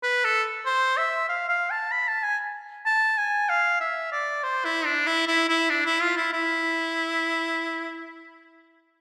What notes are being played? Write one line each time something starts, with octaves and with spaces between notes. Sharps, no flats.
B4
A4
C5
E5
F5
F5
A5
B5
A5
G#5
A5
G#5
F5
E5
D5
C5
E4
D4
E4
E4
E4
D4
E4
F4
E4
E4